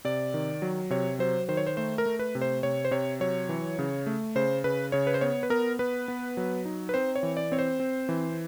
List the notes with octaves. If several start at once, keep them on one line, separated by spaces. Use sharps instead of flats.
C3 D5
D#3
F#3
C3 C#5
F#3 C5
D#3 C5
C#5
C5
A3 C5
A#4
A3
B4
C3
C5
C3 C#5
C5
C3 C#5
F#3 C#5
E3
C#3
A3
C#3 C5
C#3 B4
C#3 C#5
B4
C5
B3 C#5
B4
B3 A#4
B3 B4
B3
F#3
D#4
B4
C4 C5
C#5
E3
D5
C4 C#5
C5
C4
E3